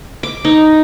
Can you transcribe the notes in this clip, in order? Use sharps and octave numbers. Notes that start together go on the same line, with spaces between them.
D6
D#4